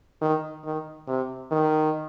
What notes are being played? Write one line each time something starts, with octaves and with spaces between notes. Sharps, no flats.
D#3
D#3
C3
D#3